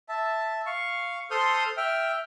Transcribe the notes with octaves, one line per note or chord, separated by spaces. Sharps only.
E5 A5
F5 C#6
A4 C5 C6 D#6 F6 G6
E5 G5 F6